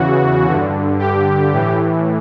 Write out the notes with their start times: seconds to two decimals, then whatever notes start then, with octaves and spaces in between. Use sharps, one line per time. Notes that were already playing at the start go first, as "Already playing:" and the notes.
Already playing: E2 C#3 E3 F#4
0.46 G2 D3
0.99 G4
1.52 A2 E3